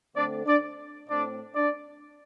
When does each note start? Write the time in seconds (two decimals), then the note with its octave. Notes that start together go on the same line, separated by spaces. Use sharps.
0.15 D3 A3 C4 D4 D5
0.46 D4 D5
1.08 A2 A3 C4 D4 D5
1.54 D4 D5